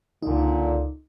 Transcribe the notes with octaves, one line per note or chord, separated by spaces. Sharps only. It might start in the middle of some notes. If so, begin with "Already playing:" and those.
C#2 A#2 D3 D#4